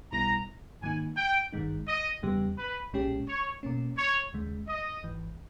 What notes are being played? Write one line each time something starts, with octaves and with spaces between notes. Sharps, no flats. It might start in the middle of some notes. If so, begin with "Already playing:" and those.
B1 B2 G3 B3 E4 A#5
G#2 D#3 A#3 D#4 G#5
G5
G#1 G2 D#3 G#3 D#4
D#5
E2 C#3 G3 B3 G4
B4
B1 A#2 G#3 C#4 G4
C#5
B2 A#3 C#4
C#5
D#2 C#3 G#3
D#5
G#1 G#2 E3